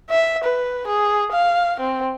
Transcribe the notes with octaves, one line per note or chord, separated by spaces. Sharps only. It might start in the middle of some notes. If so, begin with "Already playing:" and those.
E5
B4
G#4
F5
C4